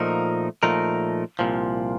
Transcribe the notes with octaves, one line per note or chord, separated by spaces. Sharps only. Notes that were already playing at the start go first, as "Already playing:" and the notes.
Already playing: A#2 F3 A3 D#4 A#4
A#2 F3 A3 D#4 A#4
C2 A#2 F3